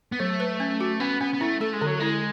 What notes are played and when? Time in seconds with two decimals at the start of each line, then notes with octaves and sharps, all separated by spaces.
0.12 B3
0.19 F#3 A3
0.40 B4
0.60 C#4
0.81 F#4
1.00 B3 C#4
1.21 B3 C#4
1.34 B3
1.41 A3 E4
1.61 A3 A4
1.73 G#3
1.81 D3
1.87 F#3
2.00 G#3 E4